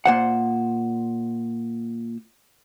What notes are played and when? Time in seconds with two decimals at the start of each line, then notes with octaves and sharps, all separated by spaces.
0.06 A#2 C5 F#5